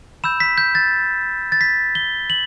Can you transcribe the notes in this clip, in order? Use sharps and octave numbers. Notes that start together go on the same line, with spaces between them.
B5 E6 G6 E7
B6
G6
A6
A6
B6
G7
F#7